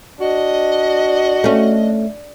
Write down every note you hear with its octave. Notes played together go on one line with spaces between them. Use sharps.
D4 F#4 D#5
A3 C#4